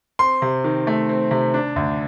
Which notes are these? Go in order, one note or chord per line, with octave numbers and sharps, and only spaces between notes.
C4 C6
C3
D#3
A3
C4
C3
D4
D2